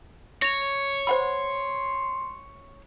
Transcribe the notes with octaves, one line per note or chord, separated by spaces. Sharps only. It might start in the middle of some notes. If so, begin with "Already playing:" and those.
C#5 A#6 F7
C5 F#5 B5 C6